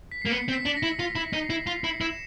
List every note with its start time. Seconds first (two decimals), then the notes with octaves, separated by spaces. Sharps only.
0.12 B6
0.22 A#3 C7
0.31 B3 C#7
0.48 C4
0.53 B6
0.65 D4
0.68 B6
0.77 A#6
0.83 E4
0.99 F4 A#6
1.16 E4
1.22 B6
1.33 D#4
1.44 C7
1.50 E4
1.67 F4 C7
1.84 E4 C#7
2.01 E4 E7